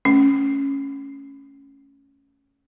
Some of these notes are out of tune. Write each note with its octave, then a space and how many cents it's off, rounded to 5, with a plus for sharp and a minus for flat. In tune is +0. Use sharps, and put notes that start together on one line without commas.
A3 +0 C#4 +0